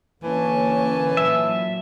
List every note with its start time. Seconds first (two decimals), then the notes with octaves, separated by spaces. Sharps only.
0.24 D3 E3 A#3 C#4 G#5 A5
1.17 A#2 F#3 E5